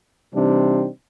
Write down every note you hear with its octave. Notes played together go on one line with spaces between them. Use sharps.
C3 E3 G3 C4 D4 D#4